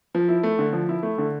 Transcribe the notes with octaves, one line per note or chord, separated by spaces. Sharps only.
F3
E4
A3
D3
F3
E4
A3
D3